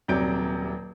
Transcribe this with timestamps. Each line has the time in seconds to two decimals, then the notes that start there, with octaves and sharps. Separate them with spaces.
0.08 D#1 C3 F#3 D5 G6 D7